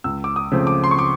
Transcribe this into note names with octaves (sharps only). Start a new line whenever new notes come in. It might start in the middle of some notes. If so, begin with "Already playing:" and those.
C#2 E6
D6
D#6
C#3 F3 A3 C4
D6
C6
C#6
D6